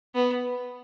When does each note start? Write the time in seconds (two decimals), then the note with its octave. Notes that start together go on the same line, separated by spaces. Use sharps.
0.15 B3